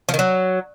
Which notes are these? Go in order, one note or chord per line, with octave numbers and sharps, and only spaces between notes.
F3
D#3
F#3